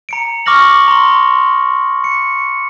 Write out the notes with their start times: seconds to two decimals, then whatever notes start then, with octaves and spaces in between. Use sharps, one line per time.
0.09 A#5 C#7 D7
0.46 C#6 D6 F6 A#6 F#7
0.88 A#5 C6
2.04 C#7